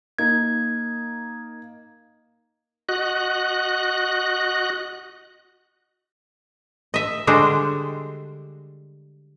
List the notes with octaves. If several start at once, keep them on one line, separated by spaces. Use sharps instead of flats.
A#3 D#4 G#6
F#4 D#5 F#6
D#5 E5
D3 G3 G#3 D4 F#4 C5